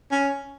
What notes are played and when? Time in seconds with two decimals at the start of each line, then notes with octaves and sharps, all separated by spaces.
0.12 C#4